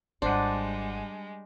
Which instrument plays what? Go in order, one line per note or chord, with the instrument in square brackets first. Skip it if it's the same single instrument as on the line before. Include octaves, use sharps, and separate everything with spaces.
[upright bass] G#1 F4 [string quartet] G3 G#3 [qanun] D4 [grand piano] C5 F#5